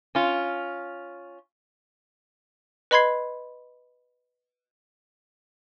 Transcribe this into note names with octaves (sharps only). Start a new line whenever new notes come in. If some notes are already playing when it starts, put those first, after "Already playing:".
C#4 F4
B4 D#5 B5 C6 G#6 C7